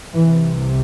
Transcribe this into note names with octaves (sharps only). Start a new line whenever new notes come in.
C2 C3 E3